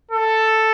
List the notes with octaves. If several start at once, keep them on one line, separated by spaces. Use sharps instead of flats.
A4